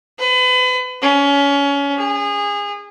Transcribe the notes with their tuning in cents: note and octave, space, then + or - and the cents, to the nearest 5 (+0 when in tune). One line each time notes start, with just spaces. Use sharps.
B4 +35
C#4 +25
G#4 -25